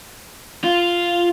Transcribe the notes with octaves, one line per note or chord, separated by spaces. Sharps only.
F4